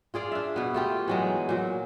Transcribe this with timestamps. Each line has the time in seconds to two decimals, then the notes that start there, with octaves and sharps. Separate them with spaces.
0.14 F4 G#4 D5 F5
0.32 D4 E5
0.56 B2 B3
0.74 A3 F4 G4
1.08 E3 F#3 G#3
1.49 A#2 F#3